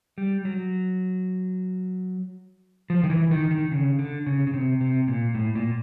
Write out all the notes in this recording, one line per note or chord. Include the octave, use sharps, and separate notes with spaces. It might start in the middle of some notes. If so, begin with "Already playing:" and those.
G3
F#3
F3
D#3
E3
D#3
D#3
C#3
D3
C#3
C#3
C3
C3
A#2
A2
A#2